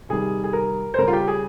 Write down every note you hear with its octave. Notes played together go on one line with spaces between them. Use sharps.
C3 D#3 G3 G#4
G#4
A#4
C5
C#3 G3 A#4
F4
G4
G#4